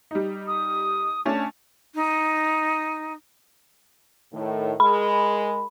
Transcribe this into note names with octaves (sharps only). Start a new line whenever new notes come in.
G3 D#4
D#6
A3 C#4 D4 A5
D#4
A2 D#3
G#3 G#4 A#4 B5